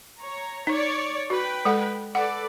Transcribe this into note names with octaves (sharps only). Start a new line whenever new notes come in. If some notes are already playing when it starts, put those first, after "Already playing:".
C#5 A#5
D#4 C#5 D5
F#4 B4 G5
G#3 A4 F#5
A4 B4 D5 F#5